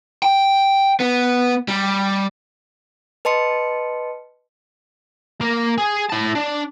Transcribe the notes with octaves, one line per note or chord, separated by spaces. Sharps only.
G5
B3
G3
B4 D#5 A5 C6 C#7
A#3 A#4
G#4
E4 A5
D4